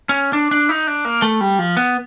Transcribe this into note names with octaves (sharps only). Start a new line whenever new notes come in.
C#4
D4
D4
D#4
D4
A#3
A3
G3
F3
B3